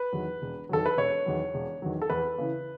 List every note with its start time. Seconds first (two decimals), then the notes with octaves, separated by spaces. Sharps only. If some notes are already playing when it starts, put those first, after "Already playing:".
Already playing: B4
0.13 E2 D#3 F#3
0.42 E1
0.69 E2 D#3 F#3 A4
0.86 B4
0.97 E1 C#5
1.26 E2 D#3 F#3
1.54 E1
1.82 E2 D#3 F#3
2.02 A4
2.10 E2 B4
2.38 C#3 E3